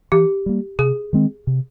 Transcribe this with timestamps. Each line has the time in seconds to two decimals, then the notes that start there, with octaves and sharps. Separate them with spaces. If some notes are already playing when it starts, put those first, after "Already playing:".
0.12 E3 G4
0.46 G3 A#3
0.79 C3 G#4
1.13 D#3 G#3 C4
1.47 C3